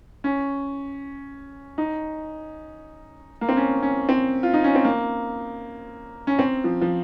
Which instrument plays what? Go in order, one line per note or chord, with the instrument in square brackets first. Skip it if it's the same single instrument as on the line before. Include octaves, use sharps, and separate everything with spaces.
[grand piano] C#4
D#4
A#3
C4
C#4
C#4
C4
F4
D#4
C#4
C4
A#3
C#4
C4
F3
F3